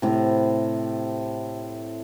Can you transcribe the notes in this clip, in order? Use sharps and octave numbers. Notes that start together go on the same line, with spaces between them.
A2 C3